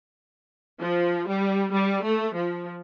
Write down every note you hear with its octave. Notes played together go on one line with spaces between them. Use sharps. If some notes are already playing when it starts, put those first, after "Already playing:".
F3
G3
G3
A3
F3